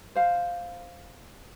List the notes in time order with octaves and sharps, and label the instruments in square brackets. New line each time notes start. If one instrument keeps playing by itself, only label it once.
[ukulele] C5 F5